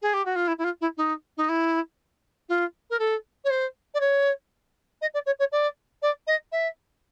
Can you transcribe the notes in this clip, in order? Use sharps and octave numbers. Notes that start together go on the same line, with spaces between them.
G#4
G4
F#4
F4
E4
E4
F4
E4
D#4
D#4
E4
F4
A#4
A4
C#5
C5
D5
C#5
D#5
D5
C#5
C#5
D5
D5
D#5
E5